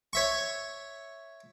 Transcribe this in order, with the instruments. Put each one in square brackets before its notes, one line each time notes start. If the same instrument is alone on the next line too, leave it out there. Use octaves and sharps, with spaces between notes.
[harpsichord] C#5 E5 C#6